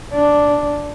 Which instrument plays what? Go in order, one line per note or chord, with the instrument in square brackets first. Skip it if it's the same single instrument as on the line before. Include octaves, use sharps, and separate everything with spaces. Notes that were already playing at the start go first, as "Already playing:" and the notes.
[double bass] D4